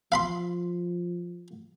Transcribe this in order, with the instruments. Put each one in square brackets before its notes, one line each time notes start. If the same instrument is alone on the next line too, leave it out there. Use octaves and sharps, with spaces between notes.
[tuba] F3 [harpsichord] F5 B5 C6